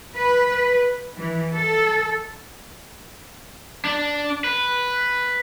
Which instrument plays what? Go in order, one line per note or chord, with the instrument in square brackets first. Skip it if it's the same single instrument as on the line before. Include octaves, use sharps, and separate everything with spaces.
[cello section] B4
E3
A4
[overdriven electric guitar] D4
B4